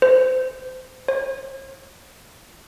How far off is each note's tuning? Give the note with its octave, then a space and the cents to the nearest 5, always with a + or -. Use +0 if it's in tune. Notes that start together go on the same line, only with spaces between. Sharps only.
C5 -30
C5 +45